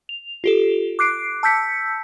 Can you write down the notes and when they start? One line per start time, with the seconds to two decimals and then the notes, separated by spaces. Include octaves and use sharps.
0.09 F7
0.44 F4 G4 A4
0.99 D6 F#6 C7 D7
1.43 A5 E6 G6 B6 C#7